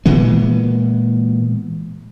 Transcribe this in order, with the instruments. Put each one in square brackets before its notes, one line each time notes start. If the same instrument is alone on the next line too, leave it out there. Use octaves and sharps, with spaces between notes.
[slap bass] A#2 E3 G#3 B3